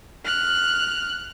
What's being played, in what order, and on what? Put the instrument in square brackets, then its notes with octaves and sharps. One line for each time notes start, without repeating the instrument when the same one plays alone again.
[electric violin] F6 F#6